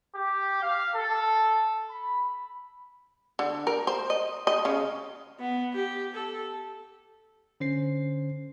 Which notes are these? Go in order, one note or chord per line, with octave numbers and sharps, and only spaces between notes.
G4
F5
A4
B5
D3
A#4
C5
D#5
D#5
C#3
B3
G4
A4
D3 C#4 C5 C7